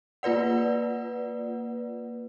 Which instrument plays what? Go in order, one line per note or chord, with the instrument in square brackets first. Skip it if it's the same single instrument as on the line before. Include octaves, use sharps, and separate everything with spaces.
[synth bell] A#3 F4 B4 D5 F#5